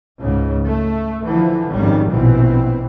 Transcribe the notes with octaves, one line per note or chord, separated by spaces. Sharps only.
C#2 G#2 C#3
A3
D3 E3 F3
G#1 F2 D#3 G3 C#4
A#1 B2 E3 C4